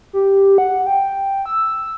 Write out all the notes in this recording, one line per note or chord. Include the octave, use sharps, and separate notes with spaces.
G4
F#5
G5
E6